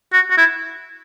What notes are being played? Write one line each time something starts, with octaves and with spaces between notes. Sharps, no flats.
F#4
F#4
E4